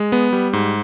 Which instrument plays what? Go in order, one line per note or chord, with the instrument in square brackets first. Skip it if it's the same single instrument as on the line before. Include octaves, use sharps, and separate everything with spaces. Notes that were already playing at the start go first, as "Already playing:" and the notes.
Already playing: [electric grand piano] G#3
B3
G3
G#2